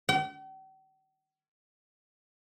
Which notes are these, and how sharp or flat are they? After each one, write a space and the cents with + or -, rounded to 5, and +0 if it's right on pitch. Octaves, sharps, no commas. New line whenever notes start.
G5 -45